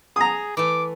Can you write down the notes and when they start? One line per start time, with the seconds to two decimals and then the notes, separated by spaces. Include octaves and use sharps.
0.16 G#4 A#5 D#6
0.57 E3 A3 D6